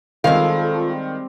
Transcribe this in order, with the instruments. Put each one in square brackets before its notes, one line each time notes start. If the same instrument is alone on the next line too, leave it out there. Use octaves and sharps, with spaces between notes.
[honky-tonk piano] D#3 [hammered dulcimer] G3 C4 [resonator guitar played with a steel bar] G#3 F5 [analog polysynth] F4 A4